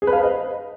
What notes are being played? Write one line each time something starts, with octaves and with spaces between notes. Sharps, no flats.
G#4
B4
F5
C5
D#5